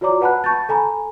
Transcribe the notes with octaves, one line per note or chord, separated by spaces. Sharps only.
F4 F#4 C#5 D5 A#5 D6
B4 F#5 A5 B5 F#6
A5 C#6 G6 A6
A4 G#5 A#5 B5